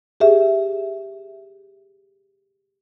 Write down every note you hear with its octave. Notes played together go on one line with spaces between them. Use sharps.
G4 G#4 E5